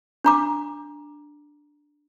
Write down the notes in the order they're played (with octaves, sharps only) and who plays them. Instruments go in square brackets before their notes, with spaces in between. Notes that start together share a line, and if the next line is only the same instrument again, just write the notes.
[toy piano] D4 A#5 D6